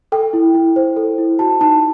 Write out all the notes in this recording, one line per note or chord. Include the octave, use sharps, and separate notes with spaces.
A4 G5
E4
E4
C5
A4
E4
F#4 A5
D#4 A5